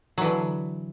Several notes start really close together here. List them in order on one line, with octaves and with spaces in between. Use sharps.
F#3 E3 D3